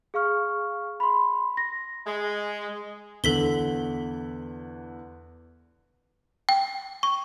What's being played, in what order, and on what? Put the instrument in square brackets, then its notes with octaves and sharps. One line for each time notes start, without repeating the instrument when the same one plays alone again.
[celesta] G#4 F5 C#6 F6
B5 C6
A#6
[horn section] G#3
[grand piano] E2 D3 [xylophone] A4 B6 G7
[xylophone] G5
C#6